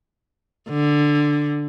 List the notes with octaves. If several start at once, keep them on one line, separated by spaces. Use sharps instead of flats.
D3